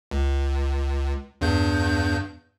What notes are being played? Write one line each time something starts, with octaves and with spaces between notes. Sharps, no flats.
C#2
E2 G2 G6